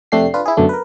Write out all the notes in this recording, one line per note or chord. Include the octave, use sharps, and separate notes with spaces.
F2 C3 A3 D4 G4 C7
D4 F4 B4
E4 G#4
F#2 B2 D3 A3 D4
A#4 B4